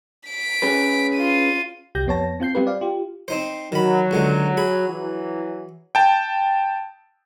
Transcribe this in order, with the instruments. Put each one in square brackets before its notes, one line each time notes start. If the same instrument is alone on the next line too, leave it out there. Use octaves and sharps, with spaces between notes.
[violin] B6 D7
[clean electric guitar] C#4 G#4 B4
[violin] F4 D#7
[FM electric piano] C2 G4 G6 A#6
F2 B3 C#5 A5 A#6
C4 F4 G6 C7
G3 C4 F4 G4 B4
D5 F5
F4 G4
[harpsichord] C4 D#4 C5
[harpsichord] D#3 B5 [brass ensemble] F#3
[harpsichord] C#2 D3 G#3
G#4 B5
[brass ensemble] E3 F#3
[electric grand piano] G5 A5